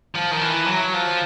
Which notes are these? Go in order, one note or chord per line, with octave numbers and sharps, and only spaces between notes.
F3
D#3
E3
F#3
F3